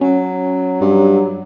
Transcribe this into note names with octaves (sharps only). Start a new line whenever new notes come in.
F#3 C#4
G2